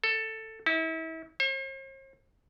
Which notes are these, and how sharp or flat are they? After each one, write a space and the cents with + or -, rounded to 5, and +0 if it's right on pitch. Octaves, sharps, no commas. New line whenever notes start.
A4 +10
E4 -35
C5 +45